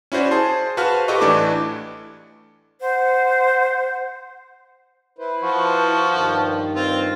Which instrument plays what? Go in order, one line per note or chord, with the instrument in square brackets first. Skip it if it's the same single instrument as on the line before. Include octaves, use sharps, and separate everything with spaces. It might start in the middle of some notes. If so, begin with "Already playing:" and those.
[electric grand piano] C#4 E4 F#4 C5 D5
G#4 C5 A5 C6
F#4 B4 C5 F5 A5 F6
F4 G4 A4 B4 D#5 C#6
A1 E3 A3 D4 C#6 D6
[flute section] C5 F#5
[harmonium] E4 B4 C5
[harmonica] F3 A5 [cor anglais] F#4
[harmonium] G2 D#3
[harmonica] C4 F4